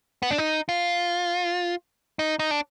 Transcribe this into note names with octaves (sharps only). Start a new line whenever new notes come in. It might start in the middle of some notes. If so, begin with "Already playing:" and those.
B3
D4
D#4
F4
D#4
D#4
D4